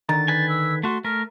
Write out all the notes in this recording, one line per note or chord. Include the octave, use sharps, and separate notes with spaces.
D3 D#3 A#5 A6
B4 G#5
E6
A3 F#4 C6
A3 A#4 F6